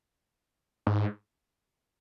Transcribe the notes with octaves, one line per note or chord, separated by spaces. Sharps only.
G#2